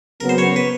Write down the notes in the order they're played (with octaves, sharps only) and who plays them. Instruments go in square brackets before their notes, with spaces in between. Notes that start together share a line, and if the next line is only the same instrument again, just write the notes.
[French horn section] C#3 F#3 B3 [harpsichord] A#4
[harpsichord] C5
C#5
B4